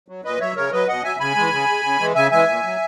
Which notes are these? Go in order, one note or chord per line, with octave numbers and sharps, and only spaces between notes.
F#3
A#2 B4 D#5
F#3 C#5 E5
C#3 A#4 C#5
F#3 B4 D#5
B2 D#5 F#5
F#3 E5 G#5
C#3 G#5 B5
E3 G#3
C#3
G#3
C#3
E3 G#3
C#3 E5 G#5
E3 G#3 E5 G#5
A#2
F#3